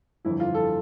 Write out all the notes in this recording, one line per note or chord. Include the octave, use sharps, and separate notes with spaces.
G1 F2 E3 E4
F4
A4